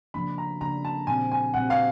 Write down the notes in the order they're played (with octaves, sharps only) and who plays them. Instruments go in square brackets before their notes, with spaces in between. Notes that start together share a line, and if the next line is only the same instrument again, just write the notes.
[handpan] C#3 F3 A#3 D4 [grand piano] B5
[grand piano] A#5
[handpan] C#3 F3 A#3 D4 [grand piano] A#5
[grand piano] A5
[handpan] A#2 G3 C4 [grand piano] G#5
[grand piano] G#5
[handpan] A#2 G3 C4 [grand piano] F#5
[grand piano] F5